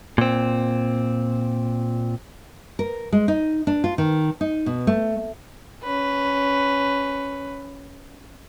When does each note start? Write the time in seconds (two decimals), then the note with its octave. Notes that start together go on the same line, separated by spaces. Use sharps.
0.18 A#2 C4
2.79 A#4
3.13 G#3
3.28 D#4
3.67 D4
3.84 F4
3.98 D#3
4.41 D#4
4.66 B2
4.87 A3
5.83 C#4 B4